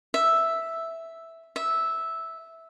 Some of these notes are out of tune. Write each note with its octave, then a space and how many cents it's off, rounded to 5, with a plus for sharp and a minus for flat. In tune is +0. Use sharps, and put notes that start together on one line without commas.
E5 +0
E5 -10